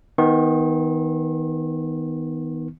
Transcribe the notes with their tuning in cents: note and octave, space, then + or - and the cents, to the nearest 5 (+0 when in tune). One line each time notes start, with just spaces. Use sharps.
D#3 +25 B3 +0 C#6 -45